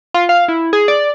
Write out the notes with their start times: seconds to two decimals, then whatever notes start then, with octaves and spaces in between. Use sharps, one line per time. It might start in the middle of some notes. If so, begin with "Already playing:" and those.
0.14 F4
0.29 F5
0.48 E4
0.73 G#4
0.88 D5